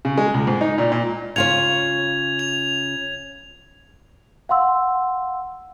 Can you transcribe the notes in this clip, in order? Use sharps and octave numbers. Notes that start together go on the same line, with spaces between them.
C#3
G#3
C#2
G#2
D#4
A#2
A#2
C#3 F4 C#5 G#6 F7
F7
F5 F#5 C6 E6